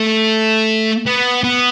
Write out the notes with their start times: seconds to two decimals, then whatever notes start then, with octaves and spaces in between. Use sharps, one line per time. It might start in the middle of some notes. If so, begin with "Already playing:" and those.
Already playing: A3
1.07 B3
1.44 B3